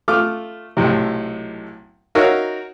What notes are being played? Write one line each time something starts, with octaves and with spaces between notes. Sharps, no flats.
A3 F4 D6 F6
B1 A2 C3
D#4 F#4 A#4 C#5 E5 F5